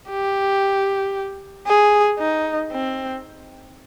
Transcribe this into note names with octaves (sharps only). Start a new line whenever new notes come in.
G4
G#4
D#4
C4